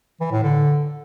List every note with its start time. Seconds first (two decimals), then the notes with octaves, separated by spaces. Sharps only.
0.20 E3
0.32 A2
0.43 D3